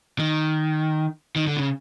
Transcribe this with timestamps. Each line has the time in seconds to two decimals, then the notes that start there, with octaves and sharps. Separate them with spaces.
0.19 D#3
1.36 D#3
1.47 D3
1.58 C#3